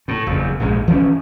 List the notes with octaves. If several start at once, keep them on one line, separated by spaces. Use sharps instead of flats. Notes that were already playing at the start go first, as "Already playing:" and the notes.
A2
F#1 E2
A#1 G#2 C#3 G#3
E3 F3 B3 C#4